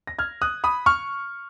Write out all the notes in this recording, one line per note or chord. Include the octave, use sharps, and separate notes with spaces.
A#6
F6 G#6
D#6 F#6
B5 D#6
C#6 F6